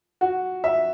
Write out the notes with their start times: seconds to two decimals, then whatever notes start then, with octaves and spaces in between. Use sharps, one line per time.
0.21 F#4
0.64 E5